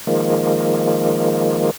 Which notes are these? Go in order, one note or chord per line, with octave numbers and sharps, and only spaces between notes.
D#3 F3 G#3 A#3